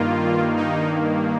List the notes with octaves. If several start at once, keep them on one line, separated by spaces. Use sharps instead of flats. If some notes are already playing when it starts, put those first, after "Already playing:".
Already playing: G2 D#3 A#3 F4
D#4